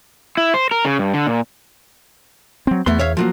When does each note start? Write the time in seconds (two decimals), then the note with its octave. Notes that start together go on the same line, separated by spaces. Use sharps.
0.37 E4
0.54 C5
0.71 A#4
0.85 C#3
0.99 G2
1.14 D3
1.27 A#2
2.67 F#3 C4
2.86 E2 A3 B3 C6
2.99 C#5 E5 F5
3.17 F3 F#3 A#3